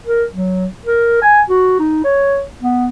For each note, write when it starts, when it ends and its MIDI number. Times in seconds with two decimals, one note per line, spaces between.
0.06 0.24 70
0.33 0.67 54
0.85 1.19 70
1.22 1.40 80
1.49 1.76 66
1.79 2.00 63
2.04 2.42 73
2.62 2.88 59